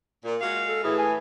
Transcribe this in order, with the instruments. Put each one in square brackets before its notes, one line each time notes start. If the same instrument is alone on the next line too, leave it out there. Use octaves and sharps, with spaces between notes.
[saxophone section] A#2
G#3 F#4 F5
[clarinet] A4
[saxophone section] A2 E3 [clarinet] G#4
[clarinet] G#5